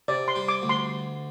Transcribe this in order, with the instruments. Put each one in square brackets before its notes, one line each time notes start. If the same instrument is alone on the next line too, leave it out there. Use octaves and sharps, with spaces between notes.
[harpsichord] C3 [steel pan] D5
[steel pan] C6
[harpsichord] G3
[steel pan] D6
[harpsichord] D2
[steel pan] C6